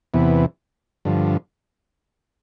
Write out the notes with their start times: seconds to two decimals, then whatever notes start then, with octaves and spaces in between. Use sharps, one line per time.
0.14 E2 C3 E3 B3
1.05 G2 D3 F3